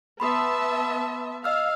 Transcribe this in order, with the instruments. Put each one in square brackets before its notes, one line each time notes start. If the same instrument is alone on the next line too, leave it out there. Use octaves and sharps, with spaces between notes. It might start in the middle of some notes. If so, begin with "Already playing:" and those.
[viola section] B3 E5 A5 [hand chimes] B5 C6 D#6
[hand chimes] D#5 E6 F6 [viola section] F5